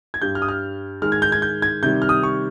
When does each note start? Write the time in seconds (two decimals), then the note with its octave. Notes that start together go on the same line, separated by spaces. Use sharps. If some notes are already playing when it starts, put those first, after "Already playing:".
0.14 G#6
0.22 G2 G3 G6
0.35 F6
0.42 D#6
0.49 F6
1.02 G#2 D#3 G#3 F6
1.12 G#6
1.22 G6
1.32 G#6
1.42 G6
1.62 G#6
1.83 C3 D#3 G3 G6
2.02 F6
2.09 D#6
2.23 C#6